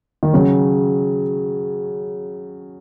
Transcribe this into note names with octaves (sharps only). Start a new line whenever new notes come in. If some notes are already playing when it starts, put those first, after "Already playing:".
D#3
C#3 F#3